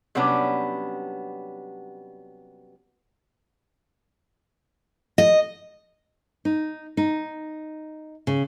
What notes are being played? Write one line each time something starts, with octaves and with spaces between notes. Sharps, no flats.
C3 F#3 G3 B3 C#4 D4
D#5
D#4
D#4
C#3